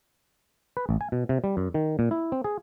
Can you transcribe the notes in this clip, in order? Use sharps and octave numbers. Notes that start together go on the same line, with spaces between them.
B4
A1
G#5
B2
C3
G3
F#2
D#3
A#2
E4
C4
G#4